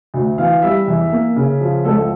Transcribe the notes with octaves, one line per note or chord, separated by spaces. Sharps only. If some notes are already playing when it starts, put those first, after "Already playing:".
D2
E3 F5
G3 E5
E2
A#3
C#3
F3
C#2 A4